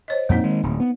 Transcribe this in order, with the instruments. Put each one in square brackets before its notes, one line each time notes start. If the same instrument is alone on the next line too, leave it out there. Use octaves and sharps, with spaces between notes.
[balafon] C5 C#5 D#5
[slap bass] F2 A#2 [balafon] A#3 C4 D#4
[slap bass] D#3 G#3
D1
B3